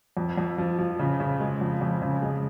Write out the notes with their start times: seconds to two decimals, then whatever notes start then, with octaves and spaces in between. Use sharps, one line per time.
0.17 F2
0.37 F2
0.58 F3
0.79 F3
0.99 C#3
1.20 C#3
1.40 G#3
1.61 F2
1.81 F2
2.02 C#3
2.22 G#3